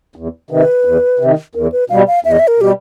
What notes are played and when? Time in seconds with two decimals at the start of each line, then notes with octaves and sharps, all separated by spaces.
0.16 E2
0.50 C3 D#3 B4
0.85 E2
1.19 C3
1.25 D#3
1.55 E2 A#4
1.72 B4
1.90 B2 G3 F5
2.07 F5
2.25 E2 E5
2.31 D#5
2.39 E5
2.48 A#4
2.59 B2 G3 G4